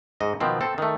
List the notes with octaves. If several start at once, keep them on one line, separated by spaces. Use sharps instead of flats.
G#2 D#5
B2 D#3 F3 C4
C4 A4
D#3 A3